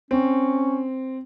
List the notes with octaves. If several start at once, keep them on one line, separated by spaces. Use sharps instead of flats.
C4 C#4